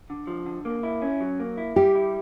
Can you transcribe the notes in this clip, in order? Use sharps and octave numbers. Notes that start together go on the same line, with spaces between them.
D3
F3
D3
A#3
E4
C#4
F#3
A#3
E4
G3 G4
E4